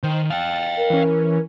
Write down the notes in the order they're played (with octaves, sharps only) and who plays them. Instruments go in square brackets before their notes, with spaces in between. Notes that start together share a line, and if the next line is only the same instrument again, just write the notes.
[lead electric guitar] D#3 [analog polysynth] C5
[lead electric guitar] F5 G5 [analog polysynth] A6
[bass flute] A#4
[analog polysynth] E3 C#4